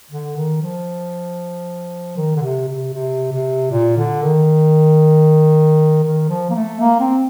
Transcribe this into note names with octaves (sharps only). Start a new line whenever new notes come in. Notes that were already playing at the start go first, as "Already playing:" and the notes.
D3
D#3
F3
D#3
D3
C3
C3
C3
C3
A#2
D3
D#3
D#3
F3
A#3
A3
A#3
C4